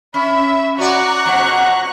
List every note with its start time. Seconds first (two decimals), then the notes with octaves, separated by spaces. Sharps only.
0.14 C#4 E5 B5
0.78 C#4 F#4 D5 A#5 C#6 F#6
1.26 F2 G#2 B2 F#5